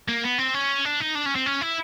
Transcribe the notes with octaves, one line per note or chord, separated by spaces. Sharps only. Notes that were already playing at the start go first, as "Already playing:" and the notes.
A#3
B3
C4
C#4
D4
D#4
D4
C#4
C4
C#4
E4